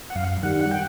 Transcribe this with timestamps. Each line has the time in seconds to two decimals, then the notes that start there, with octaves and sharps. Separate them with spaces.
0.10 F#5
0.15 F#2 F5
0.43 D#3 G3 F#5
0.61 F#5
0.71 G5